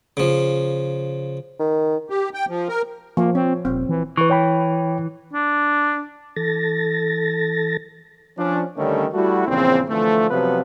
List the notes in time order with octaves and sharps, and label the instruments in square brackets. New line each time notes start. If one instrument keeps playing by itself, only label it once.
[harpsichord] C#3 F3
[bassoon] D#3
[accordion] G4
G5
F3
A#4
[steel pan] F3 [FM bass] A#3
[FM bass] C4 [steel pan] C#5
[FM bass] D#1 [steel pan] C4
[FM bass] E3
[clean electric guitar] E3 [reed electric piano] B4 C#6
[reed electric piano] C#5 G5 B5
[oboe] D4
[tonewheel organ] E3 A4 A6 A#6
[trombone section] F3 C#4 D4
D3 D#3 G3 A3 C#4
G3 A3 E4 F#4
A#1 E2 C#3 E3 C4
D3 E3 F3 A3
C3 F3 F#3 B3 F4 B4